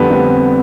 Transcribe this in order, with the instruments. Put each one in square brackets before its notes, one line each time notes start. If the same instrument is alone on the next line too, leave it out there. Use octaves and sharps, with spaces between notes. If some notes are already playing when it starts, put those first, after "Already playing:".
Already playing: [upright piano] F2 D3 G3 C4 [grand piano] B3
[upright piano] D3 G3 C4